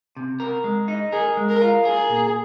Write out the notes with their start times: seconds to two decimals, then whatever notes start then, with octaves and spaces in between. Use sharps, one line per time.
0.17 C3
0.40 A#4
0.64 G#3
0.88 D#4
1.12 G#4 A#4
1.37 G#3
1.49 A#4
1.61 F4
1.85 G#4 A#4
2.09 A#2